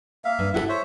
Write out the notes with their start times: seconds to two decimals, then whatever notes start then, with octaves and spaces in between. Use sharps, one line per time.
0.25 A#3 E5 F5
0.39 G2
0.54 E4 G4 A4 E5 F#5
0.69 C5 C#5 E5